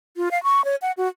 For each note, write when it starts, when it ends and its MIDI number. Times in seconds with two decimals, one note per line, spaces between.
0.17 0.31 65
0.31 0.42 77
0.43 0.64 85
0.65 0.76 73
0.82 0.92 78
0.97 1.08 66